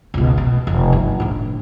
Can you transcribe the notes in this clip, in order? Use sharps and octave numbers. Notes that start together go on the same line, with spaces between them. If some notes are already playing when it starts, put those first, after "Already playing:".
C#2 B2
B2
F1
G2
A2 D3